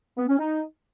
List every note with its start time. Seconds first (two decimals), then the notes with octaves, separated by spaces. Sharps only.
0.18 B3
0.28 C#4
0.39 D#4